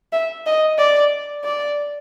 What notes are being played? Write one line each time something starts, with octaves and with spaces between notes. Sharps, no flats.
E5
D#5
D5
D5